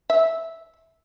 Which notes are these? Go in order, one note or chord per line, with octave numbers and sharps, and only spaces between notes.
E5